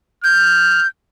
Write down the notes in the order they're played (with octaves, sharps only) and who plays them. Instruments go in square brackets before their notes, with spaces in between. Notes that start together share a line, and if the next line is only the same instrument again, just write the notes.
[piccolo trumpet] F6 [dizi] G6